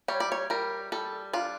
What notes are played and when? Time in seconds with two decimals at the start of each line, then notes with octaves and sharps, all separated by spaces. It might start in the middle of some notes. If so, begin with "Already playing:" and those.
0.08 G3 C#5
0.20 D5
0.32 C#5
0.50 G3 A#4
0.92 G3 A4
1.33 D4 F4